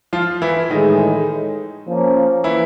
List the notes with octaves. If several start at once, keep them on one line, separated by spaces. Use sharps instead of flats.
F3 F4
E3 E4
A2 D#3 E3 G#3 D#4
F3 A#3 C#4
E3 E4